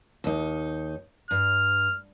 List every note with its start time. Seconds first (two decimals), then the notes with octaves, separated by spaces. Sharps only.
0.24 D#2 D#4
1.31 G2 F6